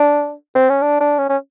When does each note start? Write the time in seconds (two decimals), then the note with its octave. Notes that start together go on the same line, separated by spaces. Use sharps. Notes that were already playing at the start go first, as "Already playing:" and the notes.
Already playing: D4
0.56 C4
0.70 C#4
0.82 D4
1.01 D4
1.19 C#4
1.30 C#4